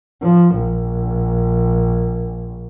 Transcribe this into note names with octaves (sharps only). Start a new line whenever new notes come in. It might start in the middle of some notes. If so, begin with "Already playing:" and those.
F3
A#1